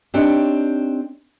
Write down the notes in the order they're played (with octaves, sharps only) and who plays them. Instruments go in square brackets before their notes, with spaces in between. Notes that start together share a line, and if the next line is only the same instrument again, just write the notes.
[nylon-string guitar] C4 D4 D#4 G4 C#5